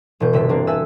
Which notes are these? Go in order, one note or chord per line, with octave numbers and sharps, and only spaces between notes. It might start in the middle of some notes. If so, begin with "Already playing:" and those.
E1 B2 G6
G1 C3 E5 B6
A#3 C4 D4
E5 F#5 G#5 A5 E6